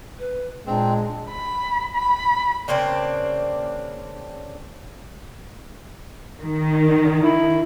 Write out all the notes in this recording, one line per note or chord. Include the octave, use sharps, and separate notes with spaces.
B4
A#2 G#3 C4 D4
B5
B5
C#3 A#3 C4 D4
D#3
E4